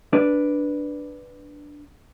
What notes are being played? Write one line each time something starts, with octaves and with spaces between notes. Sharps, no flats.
D4 B4 D5